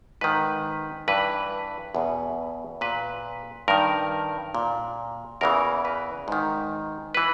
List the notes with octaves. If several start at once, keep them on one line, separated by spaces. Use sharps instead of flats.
G#2 D#3 B4
G2 E3 B4
E2 B2
A#2 B4
G2 D#3 A#4
A#2
E2 C#3 E3 A#4
B4
G#2 D#3
E3 B4